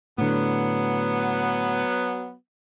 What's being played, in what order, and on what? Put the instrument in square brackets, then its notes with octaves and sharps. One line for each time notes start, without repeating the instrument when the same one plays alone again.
[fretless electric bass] A2 D3 [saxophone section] F#3 B3